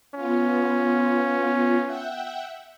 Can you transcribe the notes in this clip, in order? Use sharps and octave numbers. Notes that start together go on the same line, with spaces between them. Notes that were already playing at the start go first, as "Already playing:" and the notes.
B3 C#4 F4
E5 F#5 G5